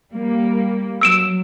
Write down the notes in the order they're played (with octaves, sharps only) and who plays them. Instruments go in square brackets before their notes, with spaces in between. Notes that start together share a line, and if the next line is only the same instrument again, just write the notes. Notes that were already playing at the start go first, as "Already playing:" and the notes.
[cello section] G3 A#3
[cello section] F#3 [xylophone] E6 D7 E7